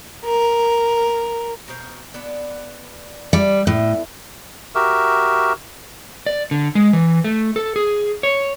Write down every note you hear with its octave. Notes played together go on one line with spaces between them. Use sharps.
A#4
B2 A#4 C5
B3 D4 B4
G3 D5 A5
A2 B3
F#4 G4 A#4 E5
D5
D3
G#3
E3
A3
A4
G#4
C#5